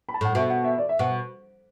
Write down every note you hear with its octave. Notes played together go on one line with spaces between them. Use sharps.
B5
A5
A2 F#5
B2 E5
F#5
E5
D5
E5
B2 F#5